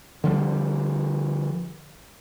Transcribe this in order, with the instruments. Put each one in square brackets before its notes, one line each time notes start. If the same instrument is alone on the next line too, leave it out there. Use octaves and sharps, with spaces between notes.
[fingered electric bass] D3 F3 G3